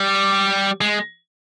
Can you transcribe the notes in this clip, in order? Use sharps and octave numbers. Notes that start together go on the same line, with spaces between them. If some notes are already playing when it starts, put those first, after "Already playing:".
Already playing: G3
G#3